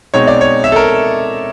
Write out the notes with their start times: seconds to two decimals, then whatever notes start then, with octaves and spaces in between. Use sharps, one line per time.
0.14 B2 G#3 C4 D#4 C#5
0.27 D5
0.41 C#5
0.64 E5
0.72 A4
0.76 A#4